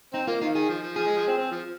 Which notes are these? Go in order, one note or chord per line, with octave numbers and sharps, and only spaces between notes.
C4 D#4
A#3 F4
D#3 F4
D#3 G#4
F3
F3
F3 G#4
G#3
F3
C4
C4
F3